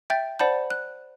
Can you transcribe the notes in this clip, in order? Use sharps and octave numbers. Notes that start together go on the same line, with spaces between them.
E5 G5 G6 A6
C5 D5 F#5 A5 B5 G6
F#6